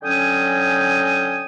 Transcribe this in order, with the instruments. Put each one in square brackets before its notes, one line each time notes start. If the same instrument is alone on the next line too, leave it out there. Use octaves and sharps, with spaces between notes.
[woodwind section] D3 F#3 C#4 G5 G#5 D#6